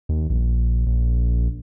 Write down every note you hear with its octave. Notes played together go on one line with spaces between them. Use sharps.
D#2
A#1
A#1